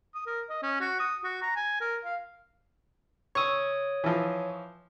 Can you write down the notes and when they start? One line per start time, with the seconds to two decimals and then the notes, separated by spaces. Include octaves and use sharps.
0.15 D#6
0.27 A#4
0.50 D#5
0.63 C#4
0.81 F#4
1.00 D#6
1.24 F#4
1.42 A#5
1.56 G#5
1.81 A#4
2.05 F5
3.35 C#5 C#6 D#6 E6
4.04 E3 F3